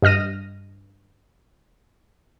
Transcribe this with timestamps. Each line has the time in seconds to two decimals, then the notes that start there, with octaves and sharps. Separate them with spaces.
0.02 G2 D#5 F6 A#6 D#7